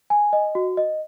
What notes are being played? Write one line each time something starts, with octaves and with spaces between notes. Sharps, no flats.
G#5
D#5
F#4
D#5